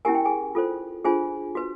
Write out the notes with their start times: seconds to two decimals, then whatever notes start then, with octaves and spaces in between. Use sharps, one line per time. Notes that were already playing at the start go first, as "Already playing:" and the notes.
0.05 C#4 E4 G4 A#4 G#5
0.15 G5
0.25 G#4 G#5
0.55 F4 A4 C5
1.05 D4 F4 G#4 C5 G#5
1.55 F#4 B4